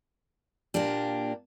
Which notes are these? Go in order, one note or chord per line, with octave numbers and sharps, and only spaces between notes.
A#2 A#3 D4 G4